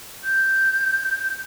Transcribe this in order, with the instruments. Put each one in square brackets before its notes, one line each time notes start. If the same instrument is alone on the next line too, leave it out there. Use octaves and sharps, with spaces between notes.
[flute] G6